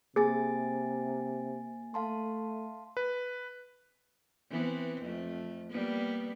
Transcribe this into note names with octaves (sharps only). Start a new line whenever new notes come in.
C3 A#3 G#4 G#5 A6
A3 F5 A5 C6
B4
E3 B3 C4
F2 A3
G3 A#3 B3